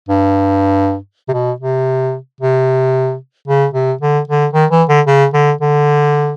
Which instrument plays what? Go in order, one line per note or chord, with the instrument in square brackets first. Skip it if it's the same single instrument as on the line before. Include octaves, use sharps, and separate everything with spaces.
[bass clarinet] G2
C3
B2
C3
C3
C#3
C3
D3
D3
D#3
E3
D3
C#3
D3
D3